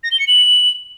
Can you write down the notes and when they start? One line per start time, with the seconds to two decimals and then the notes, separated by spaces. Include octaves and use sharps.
0.03 A#6
0.11 G7
0.19 C#7
0.27 F#7